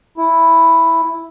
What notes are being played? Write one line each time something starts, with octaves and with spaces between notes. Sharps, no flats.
E4